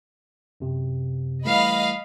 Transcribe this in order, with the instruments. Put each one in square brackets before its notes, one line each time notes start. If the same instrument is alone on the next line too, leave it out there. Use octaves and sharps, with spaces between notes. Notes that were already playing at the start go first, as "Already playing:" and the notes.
[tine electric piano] F#2 C3
[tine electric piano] E3 G3 A3 [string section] D#5 F5 B5